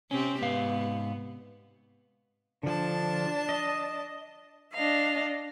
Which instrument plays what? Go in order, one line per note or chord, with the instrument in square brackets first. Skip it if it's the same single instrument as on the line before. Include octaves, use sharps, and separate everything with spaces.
[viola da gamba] C3 C4 G4 [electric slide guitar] C#4
[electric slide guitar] G#2 F5 [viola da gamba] B3
[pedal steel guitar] D3 F3 [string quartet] D4 A5
[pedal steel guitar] D#5
[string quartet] D4 D#5 F5